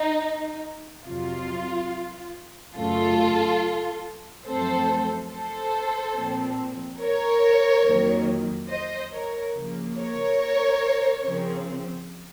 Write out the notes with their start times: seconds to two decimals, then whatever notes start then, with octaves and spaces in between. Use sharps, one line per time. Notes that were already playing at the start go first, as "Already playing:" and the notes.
Already playing: D#4
1.07 F2 C3 F#3 F4
2.76 F#2 C#3 A3 F4 A4
4.46 F#2 F3 A3 C4 A4 C5
5.30 A4 C5
6.16 A#2 F3 C4
7.00 A#4 C#5
7.85 F2 D#3 F#3 A#3
8.69 C5 D#5
9.12 A#4 C#5
9.55 C#3 F3 A#3
9.97 A#4 C#5
11.25 C#3 F3 C4